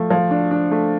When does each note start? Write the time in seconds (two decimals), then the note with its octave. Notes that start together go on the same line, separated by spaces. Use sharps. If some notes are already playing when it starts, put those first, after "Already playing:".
Already playing: F3 A3
0.10 F3
0.31 D4
0.51 D4
0.71 A3